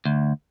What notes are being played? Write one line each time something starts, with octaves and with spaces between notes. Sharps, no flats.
D2